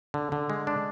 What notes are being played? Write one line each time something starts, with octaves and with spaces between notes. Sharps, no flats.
D3
D3
G#3
D4